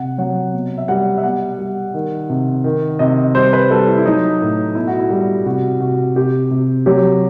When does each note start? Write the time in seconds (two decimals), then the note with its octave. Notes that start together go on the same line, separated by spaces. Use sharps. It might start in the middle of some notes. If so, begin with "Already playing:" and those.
Already playing: C3 F#5
0.18 F#3 F#5
0.54 B2
0.78 E5
0.88 G3 F#5
1.17 E5
1.23 B2 F#5
1.59 G3
1.94 D#3
2.30 C3
2.64 D#3
2.99 C3 D#5
3.34 G3 C5
3.53 B4
3.71 G3 A4
3.87 E4
3.98 E4
4.05 F#3 D#4
4.41 A2
4.75 B2 E4
4.87 F#4
4.99 E4
5.10 G3
5.45 C3 F#4
5.81 C3 F#4
6.16 C3 G4
6.51 C3
6.86 F#3 G4